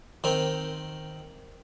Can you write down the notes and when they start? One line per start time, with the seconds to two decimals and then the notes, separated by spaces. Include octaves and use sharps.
0.24 D#3 C4